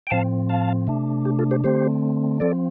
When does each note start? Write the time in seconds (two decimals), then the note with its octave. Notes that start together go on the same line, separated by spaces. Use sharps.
0.07 G5
0.10 A2 F3 C4 F5 A5
0.49 F5 A5
0.87 C3 A3 D4
1.25 G4
1.39 F4 A4
1.51 G4 C5
1.64 D3 A3 C4 G4 C5
2.40 F3 C4 A4 D5